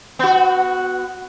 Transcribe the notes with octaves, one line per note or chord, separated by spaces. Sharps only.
B3 F#4